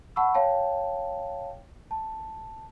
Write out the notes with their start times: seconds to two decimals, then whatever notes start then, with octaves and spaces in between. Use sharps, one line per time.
0.16 F#5 A5 B5 C#6 E6
0.34 C#5 F5 G5 A5
1.91 A5